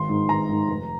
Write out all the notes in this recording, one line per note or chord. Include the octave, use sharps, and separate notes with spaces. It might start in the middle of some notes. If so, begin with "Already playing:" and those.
Already playing: G#1 C6
G#2 D#3
G#1 A#5
G#2 D#3
F1